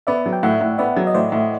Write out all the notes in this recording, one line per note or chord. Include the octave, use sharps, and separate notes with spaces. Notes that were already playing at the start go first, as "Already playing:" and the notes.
B3 D5 E5
F#3
G5
A2 E5 F#5
A2
B3 D5 E5
F#3
D#5
A2 C5 D5
A2